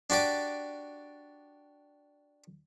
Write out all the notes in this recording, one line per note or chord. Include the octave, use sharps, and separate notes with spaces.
D4 F#4 G4 D5